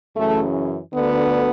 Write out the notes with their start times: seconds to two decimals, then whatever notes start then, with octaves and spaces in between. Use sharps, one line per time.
0.15 F#2 C#3 E3 A3
0.92 D2 D3 B3